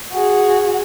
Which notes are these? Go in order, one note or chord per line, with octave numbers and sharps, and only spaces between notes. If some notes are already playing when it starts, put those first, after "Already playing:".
F#4 G#4